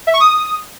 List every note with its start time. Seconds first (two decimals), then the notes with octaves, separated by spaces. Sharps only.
0.07 E5
0.14 C#6
0.20 D#6